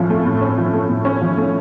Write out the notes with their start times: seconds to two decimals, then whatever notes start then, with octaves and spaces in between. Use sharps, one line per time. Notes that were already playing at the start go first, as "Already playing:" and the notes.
Already playing: A2 F3 C#4
0.10 A3
0.25 A2
0.41 C#4
0.58 F3
0.73 A3
0.89 A2
1.05 C#4
1.21 F3
1.37 A3